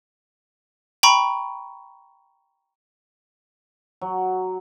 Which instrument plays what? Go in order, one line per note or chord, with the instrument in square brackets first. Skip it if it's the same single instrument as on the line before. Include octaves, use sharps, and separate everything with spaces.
[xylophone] G5 A#5 B5 C#6
[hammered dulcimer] F#3